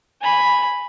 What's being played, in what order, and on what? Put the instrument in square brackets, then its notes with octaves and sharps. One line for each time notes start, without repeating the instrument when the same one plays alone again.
[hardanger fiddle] G#5 B5